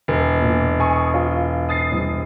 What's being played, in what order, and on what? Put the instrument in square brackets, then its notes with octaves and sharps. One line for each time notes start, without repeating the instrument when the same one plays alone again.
[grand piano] E1
[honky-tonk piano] A#2
G#5 C#6 D#6
F4
D#6 A6 C7
C2